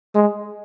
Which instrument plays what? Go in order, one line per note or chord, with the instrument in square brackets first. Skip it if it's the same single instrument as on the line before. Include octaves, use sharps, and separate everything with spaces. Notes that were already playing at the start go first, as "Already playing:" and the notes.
[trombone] G#3